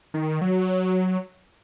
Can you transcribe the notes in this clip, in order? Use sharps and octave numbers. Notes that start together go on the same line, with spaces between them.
D#3
F#3